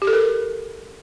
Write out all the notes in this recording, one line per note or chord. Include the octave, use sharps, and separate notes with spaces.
G4
A4
A#4